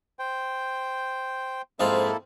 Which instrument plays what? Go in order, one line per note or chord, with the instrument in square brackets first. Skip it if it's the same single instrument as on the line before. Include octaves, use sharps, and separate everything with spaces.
[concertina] C5 G5
[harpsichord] F2 G#2 F4 [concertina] A#3 E4 A4